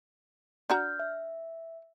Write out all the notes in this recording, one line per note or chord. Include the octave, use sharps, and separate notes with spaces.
D4 F#4 A#5 F6 G6
E5